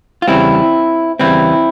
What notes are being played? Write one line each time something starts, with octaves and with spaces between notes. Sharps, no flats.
F4
E2 C#3 E3 G3 C4 E4
E2 C#3 E3 G3 C4 E4